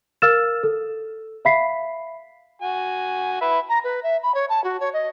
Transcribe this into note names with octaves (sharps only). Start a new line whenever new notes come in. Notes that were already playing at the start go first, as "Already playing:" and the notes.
A#4 F5 E6 F6 A6 E7
A4
E5 F5 B5 B6 C7
F#4 G#5
B4 E5
A#5
B4
E5
B5
C#5
A5
F#4
C#5
D#5